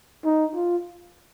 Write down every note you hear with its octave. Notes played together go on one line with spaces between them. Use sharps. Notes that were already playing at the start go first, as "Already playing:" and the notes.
D#4
F4